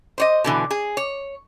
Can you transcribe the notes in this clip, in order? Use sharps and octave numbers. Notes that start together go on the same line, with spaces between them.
C5 C#5 D#5
B2 D3 E3
G#4
C#5